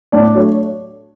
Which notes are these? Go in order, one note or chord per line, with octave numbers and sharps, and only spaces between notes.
A2 D4 D5
F#3 A3 C#5